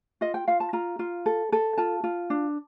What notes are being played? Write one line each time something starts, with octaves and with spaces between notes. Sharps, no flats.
F4 D#5
G5
F4 F5
A5
F4 A#5
F4
A4
A4
F4 A5
F4
D4